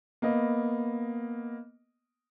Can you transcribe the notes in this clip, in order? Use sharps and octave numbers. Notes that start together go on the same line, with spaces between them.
A#3 B3 D#5